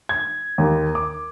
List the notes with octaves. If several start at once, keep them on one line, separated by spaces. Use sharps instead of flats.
G#6
D#2
D6